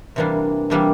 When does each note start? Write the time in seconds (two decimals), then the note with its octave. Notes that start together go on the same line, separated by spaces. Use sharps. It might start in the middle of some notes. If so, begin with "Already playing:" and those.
0.16 C3 E3 G3 A#3 D4
0.70 C3 E3 G3 A#3 D4